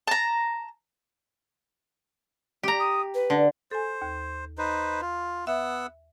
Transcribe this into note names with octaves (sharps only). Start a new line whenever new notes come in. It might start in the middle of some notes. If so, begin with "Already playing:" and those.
A5 A#5
G4 A#5
D#6
B4
D3
A4 C5 G#5
D#2
D#4 B4 C5
F4
B3 E5 F#5 E6